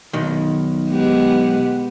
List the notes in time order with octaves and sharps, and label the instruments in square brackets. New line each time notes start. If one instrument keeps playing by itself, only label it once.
[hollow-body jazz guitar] B1 D#3
[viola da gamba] G#3 B3 G4